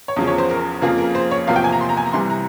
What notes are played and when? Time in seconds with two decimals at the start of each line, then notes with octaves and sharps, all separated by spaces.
0.08 C#5
0.16 E2 C#3 F3
0.27 C#5
0.38 C5
0.50 A#4
0.82 F2 C#3 F3 A#3 G#4
0.98 A#4
1.15 C5
1.31 C#5
1.47 E2 C3 F3 A#3 F5
1.56 G5
1.64 G#5
1.72 A#5
1.81 C6
1.89 A#5
1.97 G#5
2.06 A#5
2.13 C2 C3 E3 G3 C6
2.30 A#5